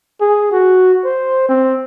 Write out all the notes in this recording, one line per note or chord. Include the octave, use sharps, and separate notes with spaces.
G#4
F#4
C5
C4